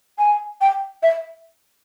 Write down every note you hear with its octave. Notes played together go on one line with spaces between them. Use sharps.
G#5
G5
E5